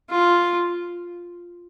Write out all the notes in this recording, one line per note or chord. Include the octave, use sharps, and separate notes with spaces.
F4